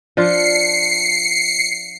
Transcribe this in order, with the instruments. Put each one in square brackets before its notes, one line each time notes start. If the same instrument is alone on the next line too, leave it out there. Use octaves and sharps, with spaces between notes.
[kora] F3 D4 F4 [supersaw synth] C7 C#7